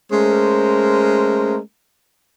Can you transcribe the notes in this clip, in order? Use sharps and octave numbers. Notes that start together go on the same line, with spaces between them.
G#3 A3 C#4 A#4 C5